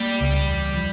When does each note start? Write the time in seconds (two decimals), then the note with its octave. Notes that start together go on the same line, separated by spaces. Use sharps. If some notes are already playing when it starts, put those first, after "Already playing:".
Already playing: G3 A#3
0.21 C#2
0.47 E2
0.74 F3